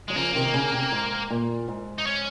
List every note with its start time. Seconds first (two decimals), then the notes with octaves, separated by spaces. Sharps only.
0.08 F#3 G#3
0.16 C#3 F3 A#3
0.35 C3 D#3
0.54 C#3
0.74 C3
0.92 G#2
1.30 A#2
1.68 G#2
1.98 D#4
2.06 C#4